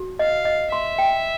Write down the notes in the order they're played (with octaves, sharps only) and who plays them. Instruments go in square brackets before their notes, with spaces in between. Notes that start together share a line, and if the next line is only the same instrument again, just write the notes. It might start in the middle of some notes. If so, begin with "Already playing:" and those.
Already playing: [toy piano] F#4
[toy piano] D#5 [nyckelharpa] F5
[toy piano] D#5
[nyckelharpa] E5 [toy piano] C6
[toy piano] G5